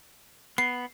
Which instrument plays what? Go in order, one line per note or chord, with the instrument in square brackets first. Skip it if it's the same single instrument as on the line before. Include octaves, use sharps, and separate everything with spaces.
[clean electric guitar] B3 [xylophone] C7